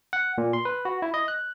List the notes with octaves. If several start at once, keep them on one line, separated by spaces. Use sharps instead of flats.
F#5
A#2
C6
B4
F#4
E4
D#5
F#6